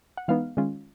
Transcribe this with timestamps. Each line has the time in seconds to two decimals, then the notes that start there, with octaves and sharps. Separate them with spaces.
0.17 F#5
0.28 E3 G#3 B3 D#4 F5
0.57 D#3 G#3 C#4 F4